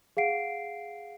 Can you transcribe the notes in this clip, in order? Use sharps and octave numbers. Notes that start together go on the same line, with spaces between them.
G#4 F5 F#5 C7 D7